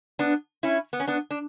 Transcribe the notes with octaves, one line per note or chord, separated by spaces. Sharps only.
B3 D4
C#4 E4
B3
C#4
B3 D4
D4